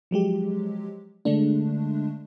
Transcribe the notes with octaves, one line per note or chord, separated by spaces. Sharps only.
F3 F#3 G#3 G4
D3 G#3 A3 D4